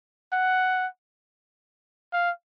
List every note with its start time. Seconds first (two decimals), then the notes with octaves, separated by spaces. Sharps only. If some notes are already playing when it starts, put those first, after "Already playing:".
0.33 F#5
2.13 F5